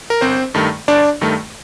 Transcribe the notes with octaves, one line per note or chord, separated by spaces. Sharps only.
A#4
G1 C4 C5
G2 D#3 A3
G1 D4 D5
G2 D#3 A3